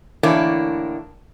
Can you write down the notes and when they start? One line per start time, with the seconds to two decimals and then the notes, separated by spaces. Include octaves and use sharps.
0.23 A2 D3 E3 A#3 D4 C#5